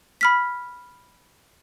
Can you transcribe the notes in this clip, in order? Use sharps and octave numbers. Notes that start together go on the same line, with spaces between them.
B5 F6 B6